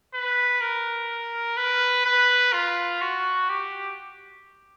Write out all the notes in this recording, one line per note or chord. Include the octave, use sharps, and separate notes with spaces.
B4
A#4
B4
B4
F4
F#4
G4